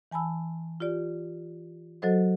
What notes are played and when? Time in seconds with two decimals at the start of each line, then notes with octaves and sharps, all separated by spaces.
0.11 E3 G#5 A5 B5 E6
0.80 F4 G4 D5
2.02 F#3 F#4 A4 C5 D#5